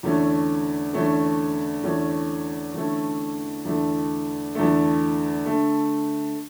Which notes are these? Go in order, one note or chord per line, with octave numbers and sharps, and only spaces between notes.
E2 D3 A3 C#4
E2 D3 A3 C#4
E2 D3 A3 C#4
E2 D3 A3 C#4
E2 D3 A3
E2 D3 A3
D3 A3